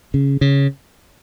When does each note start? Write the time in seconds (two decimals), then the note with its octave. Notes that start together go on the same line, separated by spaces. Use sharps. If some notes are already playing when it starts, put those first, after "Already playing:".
0.14 C#3
0.41 C#3